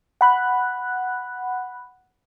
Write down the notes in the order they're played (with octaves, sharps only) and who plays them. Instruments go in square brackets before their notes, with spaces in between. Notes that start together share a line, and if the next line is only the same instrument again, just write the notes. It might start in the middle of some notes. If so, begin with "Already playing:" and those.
[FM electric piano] F#5 B5 F#6